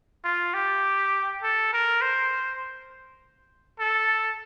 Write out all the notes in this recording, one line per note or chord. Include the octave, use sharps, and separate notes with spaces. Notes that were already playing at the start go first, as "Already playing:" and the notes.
F4
G4
A4
A#4
C5
A4